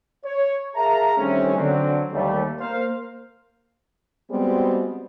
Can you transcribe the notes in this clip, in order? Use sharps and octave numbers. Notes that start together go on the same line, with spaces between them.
C#5
G#4 A#4 E5 F5 A5 A#5
G2 D#3 A3 C4 C#4
D3 F#3 C4
D#2 G3 A3
A#3 A#4 C5 F5
G3 G#3 B3 C4 F#4